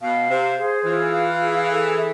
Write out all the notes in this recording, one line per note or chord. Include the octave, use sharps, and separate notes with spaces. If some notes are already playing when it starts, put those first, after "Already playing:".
B2 F5
C3 C5
G#4
E3 F4
F5
G#4
A4
E5